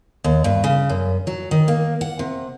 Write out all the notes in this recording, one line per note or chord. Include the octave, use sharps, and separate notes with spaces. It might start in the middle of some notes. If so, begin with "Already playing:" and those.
D#2
G2
C#3
F#2
F#3
D#3
A#3
F#5
C3